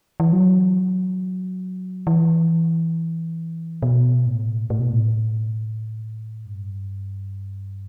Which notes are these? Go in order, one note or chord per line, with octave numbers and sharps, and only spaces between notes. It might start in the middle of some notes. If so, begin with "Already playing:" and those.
E3
F#3
E3
B2
A2
A2
B2
A2
G2